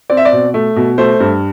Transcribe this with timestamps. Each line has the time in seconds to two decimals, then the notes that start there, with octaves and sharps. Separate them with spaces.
0.10 C4 D5
0.17 E5
0.25 D5
0.32 B2
0.54 A3
0.76 B2
0.98 A3 C5
1.20 G2